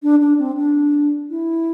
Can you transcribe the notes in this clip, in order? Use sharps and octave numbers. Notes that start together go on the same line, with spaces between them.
D4
D4
C4
D4
E4